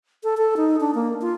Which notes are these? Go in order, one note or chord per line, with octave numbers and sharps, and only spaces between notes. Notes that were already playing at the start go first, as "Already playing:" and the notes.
A4
A4
D#4
D4
A#3
F4